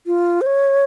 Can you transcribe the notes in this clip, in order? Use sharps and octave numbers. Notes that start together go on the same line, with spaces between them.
F4
C5
C#5